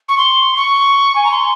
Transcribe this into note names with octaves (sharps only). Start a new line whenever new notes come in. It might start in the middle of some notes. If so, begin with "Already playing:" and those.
C#6
C6
C#6
G#5
A#5
C6